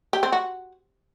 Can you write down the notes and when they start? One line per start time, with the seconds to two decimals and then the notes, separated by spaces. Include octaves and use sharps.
0.13 G4
0.23 C4
0.32 F#4